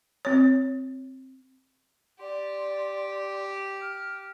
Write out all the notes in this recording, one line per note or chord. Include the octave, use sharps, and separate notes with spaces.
C4 C#5
G4 D5 C6
F6